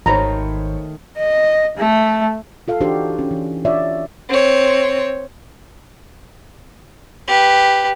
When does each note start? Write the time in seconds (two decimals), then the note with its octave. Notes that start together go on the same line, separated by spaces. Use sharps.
0.06 G#1 D#3 A3 C5 C#5 A#5 B5
1.17 D#5
1.77 A3
2.68 F4 A4 F5
2.80 E3 D4 D#4 F#4 G4 C5
3.19 C#4
3.31 E3
3.65 D4 F4 C#5 D5 E5
4.30 C4 C#5
7.28 G4 B4